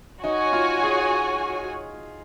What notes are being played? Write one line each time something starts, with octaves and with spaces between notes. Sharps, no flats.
D#4 F#4 C#5 G#5
F4
G#4